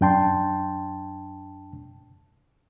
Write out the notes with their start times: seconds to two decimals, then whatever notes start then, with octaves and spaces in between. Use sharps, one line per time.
0.01 F#2 D4 G5 A5 C6